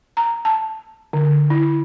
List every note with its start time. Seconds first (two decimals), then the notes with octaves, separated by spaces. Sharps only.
0.17 A#5
0.45 A5
1.13 D3
1.50 E4